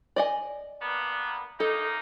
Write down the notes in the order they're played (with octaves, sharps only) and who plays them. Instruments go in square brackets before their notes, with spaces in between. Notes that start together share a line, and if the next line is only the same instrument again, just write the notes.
[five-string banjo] D5 D#5 G#5
[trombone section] G2 A#3 B3
[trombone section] F#2 A#3 D#4 [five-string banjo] A4